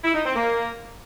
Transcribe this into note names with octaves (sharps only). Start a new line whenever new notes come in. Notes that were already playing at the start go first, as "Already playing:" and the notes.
E4
D#4
C4
A#3